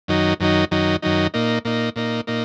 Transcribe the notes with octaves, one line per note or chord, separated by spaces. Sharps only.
F#2 D#3 F#3 D#4
F#2 D#3 F#3 D#4
F#2 D#3 F#3 D#4
F#2 D#3 F#3 D#4
A#2 A#3 D#4
A#2 A#3 D#4
A#2 A#3 D#4
A#2 A#3 D#4